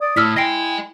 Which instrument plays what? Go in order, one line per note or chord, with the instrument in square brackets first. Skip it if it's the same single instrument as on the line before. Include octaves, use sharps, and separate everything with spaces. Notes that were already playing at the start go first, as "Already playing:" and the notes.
[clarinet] D5 [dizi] D#6
[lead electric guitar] A2 [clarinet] E4 [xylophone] E6 F6 B6
[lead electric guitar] D#5 G#5 [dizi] G5 [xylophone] A#6 C7 D7